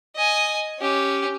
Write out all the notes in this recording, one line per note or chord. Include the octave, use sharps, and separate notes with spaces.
D#5 G#5
C#4 G4